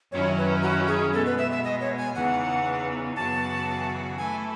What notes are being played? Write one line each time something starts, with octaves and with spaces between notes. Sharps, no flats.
F#2 D#3 F#3 C#4 E4 C#5
B4
F#4
G#4
B2 G#3 B3 A4
B4
E5
E5
D#5
C#5
G#5
E2 C#3 E3 B3 D#4 F#5
F#2 C#3 E3 B3 F#4 A5
E3 A3 E4 A4 G#5